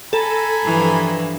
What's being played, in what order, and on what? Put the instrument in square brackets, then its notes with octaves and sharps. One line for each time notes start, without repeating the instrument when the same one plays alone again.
[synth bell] A4 [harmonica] G#5 A#5 B5
[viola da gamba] G2 E3 F3